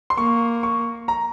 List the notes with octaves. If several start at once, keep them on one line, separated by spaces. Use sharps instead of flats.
C6
A#3 C#6
C#6
A#5